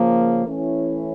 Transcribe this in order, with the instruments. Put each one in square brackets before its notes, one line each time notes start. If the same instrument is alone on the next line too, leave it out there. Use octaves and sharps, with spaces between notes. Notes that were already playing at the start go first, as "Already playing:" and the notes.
Already playing: [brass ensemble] C#3 F3 A#3
E3 A3 C#4 E4